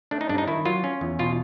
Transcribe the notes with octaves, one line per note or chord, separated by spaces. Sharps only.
A3 D4
D#4
G2 D4
D#4
D#3 E4
F#3 F4
C#4
E2
B2 F4